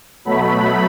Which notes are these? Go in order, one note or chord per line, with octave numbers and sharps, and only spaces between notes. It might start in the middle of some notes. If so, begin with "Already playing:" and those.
B2 F#3 A3 B5